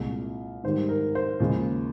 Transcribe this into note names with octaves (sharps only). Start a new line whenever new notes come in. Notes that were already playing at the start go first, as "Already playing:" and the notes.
Already playing: C2 A#2 G#3
G#2 D#3 G3 C5
A#4
C5
D#2 C#3 F3 G#3